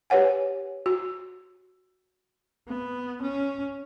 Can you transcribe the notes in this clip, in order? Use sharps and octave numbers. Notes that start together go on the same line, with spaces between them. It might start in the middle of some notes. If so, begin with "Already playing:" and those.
G4 B4 C#5 F#5 G#5
F#4
B3
C#4